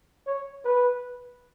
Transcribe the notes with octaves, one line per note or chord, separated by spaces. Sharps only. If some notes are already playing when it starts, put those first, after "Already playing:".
C#5
B4